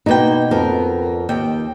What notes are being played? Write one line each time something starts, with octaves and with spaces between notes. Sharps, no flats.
B2 A#3 B3 D#4 G5
F2 B3 A#4
D#2 G5